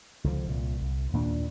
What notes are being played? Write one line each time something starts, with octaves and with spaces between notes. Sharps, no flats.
C#2 D3 F3
C2 A#2
C2
D#2 A#2 B3 D4